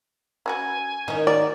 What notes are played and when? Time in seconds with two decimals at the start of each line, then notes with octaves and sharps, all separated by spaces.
0.46 C#4 F#4 B4 G#5
1.08 D#3 E3 C#4
1.27 F#4 A#4 D5